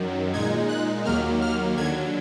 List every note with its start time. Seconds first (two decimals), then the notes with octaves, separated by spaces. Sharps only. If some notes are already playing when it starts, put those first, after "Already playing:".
Already playing: F#2 D#3 F#3
0.34 A#2 G#3 D#4 G#6
0.69 F#6
1.05 D#2 D#3 F#3 A#3 F6
1.42 F6
1.78 D#2 D3 F#3 G#6